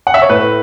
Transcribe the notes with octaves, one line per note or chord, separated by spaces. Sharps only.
F#5
E5
C#5
A2 B4